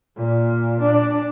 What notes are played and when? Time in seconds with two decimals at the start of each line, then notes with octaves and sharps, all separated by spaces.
0.17 A#2
0.81 D4